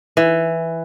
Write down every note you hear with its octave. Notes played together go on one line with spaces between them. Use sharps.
E3